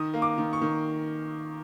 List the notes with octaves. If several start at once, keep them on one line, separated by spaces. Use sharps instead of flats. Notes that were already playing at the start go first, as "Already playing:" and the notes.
Already playing: D#3 D#6
A#3
D6
D#3
C#6
D#3